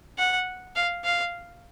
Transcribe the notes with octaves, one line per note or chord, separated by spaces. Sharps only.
F#5
F5
F5